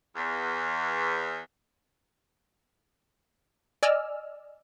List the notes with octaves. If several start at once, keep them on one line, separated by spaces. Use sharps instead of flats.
E2
D5 D#5 G#5 E6 F6